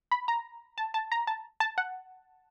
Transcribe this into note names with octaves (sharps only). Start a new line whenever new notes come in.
B5
A#5
A5
A5
A#5
A5
A5
F#5